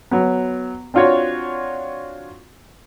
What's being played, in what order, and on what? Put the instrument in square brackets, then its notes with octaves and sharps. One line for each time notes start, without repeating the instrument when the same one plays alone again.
[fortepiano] F#3 B3
C4 D4 F4 F#4 C#5